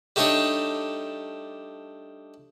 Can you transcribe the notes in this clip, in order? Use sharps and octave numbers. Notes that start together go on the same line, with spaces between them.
G3 A3 D4 D#4 C#5